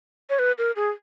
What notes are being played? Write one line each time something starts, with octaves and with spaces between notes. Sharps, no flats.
C#5
B4
A#4
G#4